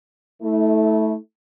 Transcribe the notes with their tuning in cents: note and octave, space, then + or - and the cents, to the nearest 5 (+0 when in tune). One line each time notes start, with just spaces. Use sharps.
A3 -10 E4 -40